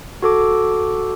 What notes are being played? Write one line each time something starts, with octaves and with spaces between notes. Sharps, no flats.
F#4 A4 D6